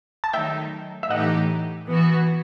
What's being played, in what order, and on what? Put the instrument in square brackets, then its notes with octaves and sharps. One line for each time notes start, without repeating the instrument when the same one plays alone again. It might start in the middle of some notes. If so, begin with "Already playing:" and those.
[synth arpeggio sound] A5
[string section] D#3 F#3 A3 D#4 [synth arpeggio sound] E5 G5
[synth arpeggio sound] E5
[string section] A2 E3 A3 D#4 G4 [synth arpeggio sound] D#5 F#5
[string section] E3 B3 F#4